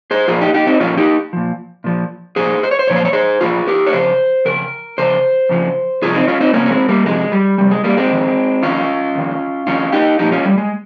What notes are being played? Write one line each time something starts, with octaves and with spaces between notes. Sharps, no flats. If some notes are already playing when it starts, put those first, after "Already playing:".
G#4 C5
A#2 F3 F4 G#4
D#4 G4
D#4 G4
C4 D#4
A#2 F3 C#4 F4
D#4 G4
A#2 F3
A#2 F3
A#2 F3 G#4 C5
C5
C#5
C5
A#2 F3 C#5
C5
C#5
G#4 C5
A#2 F3 F4 G#4
G4 A#4
C#5
F2 C#3 C5
F2 C#3 A#4
F2 C#3 C5
F2 C#3 F3
F2 C3 F3 F4 G#4
C4 D#4
C#4 F4
C4 D#4
F2 C3 F3 A#3 C#4
C#4
G#3 C4
G3 A#3
F2 C3 F3 G#3
G3
F2 C3 G3
G#3
G3 A#3
G#3 C4
F2 D#3
F2 D#3 C#4 F4
F2 D#3
F2 D#3 C#4 F4
D#4 G4
A#2 F3 D#4 G4
C#4 F4
G3
G#3